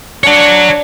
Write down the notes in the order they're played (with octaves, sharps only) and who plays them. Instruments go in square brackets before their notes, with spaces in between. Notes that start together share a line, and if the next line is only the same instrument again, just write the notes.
[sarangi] D4 [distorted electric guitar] C#5 F#5